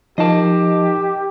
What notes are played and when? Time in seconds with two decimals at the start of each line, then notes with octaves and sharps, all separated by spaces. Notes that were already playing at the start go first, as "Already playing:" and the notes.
0.18 F3 D#4 G4 A#4 D#5 A5